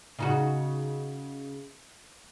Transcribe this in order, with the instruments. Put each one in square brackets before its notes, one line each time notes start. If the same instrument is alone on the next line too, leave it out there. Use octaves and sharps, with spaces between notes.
[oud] C#3 D#4 F#4